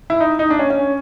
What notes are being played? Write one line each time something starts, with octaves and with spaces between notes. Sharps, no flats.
E4
D#4
D#4
D4
C#4
C#4